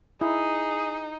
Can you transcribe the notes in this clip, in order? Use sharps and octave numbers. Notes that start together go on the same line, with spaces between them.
D#4 E4 G#4